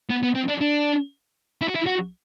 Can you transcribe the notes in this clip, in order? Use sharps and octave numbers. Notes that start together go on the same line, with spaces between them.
B3
B3
C4
D4
D4
E4
F#4
E4
F#4